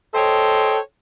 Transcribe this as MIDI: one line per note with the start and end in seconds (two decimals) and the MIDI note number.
0.15 0.78 69
0.15 0.78 72
0.15 0.78 73
0.15 0.78 75
0.15 0.78 79